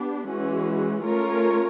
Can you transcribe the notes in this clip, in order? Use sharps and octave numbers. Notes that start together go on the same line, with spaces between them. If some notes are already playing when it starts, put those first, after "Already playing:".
Already playing: B3 D4 G4
E3 G#3 C#4 F#4
A3 C#4 F4 A#4 C#5